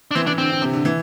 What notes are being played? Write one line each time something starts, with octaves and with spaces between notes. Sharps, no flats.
D4
E3 C4
E3 D4
D3 C4
D3
C3
D3
E3